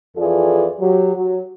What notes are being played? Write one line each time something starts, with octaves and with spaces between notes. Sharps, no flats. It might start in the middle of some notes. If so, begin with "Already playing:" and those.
F2 E3 F4 G#4 A4 D5
F#3 G4
F#3